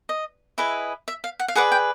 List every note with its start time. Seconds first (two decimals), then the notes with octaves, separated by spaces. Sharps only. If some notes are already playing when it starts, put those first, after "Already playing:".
0.09 D#5
0.58 E4 G#4 B4 D#5 E5
1.08 E5
1.24 F5
1.40 F#5
1.48 F5
1.55 G#4 B4 D5 F#5
1.72 G5